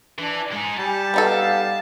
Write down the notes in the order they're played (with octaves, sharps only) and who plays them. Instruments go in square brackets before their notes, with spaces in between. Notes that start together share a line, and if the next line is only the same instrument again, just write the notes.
[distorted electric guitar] E3 [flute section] D4
[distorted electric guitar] G#3 D#4 [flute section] G#5
[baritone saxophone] G3 [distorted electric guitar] A5
[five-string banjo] B3 D#4 A4 [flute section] F5